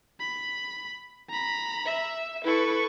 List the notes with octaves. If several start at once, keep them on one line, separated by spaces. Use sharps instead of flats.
B5
A#5 B5
E5
E4 A4 B4 C#6